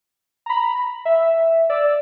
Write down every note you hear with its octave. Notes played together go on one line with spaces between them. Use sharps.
A#5 B5
E5
D5 E6